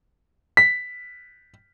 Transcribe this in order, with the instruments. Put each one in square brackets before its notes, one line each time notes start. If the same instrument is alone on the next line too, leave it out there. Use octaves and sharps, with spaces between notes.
[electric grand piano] B6